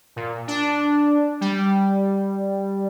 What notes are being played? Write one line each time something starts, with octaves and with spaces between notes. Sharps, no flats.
A#2
D4
G3